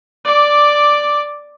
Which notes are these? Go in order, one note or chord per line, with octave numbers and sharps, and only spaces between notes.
D5 D6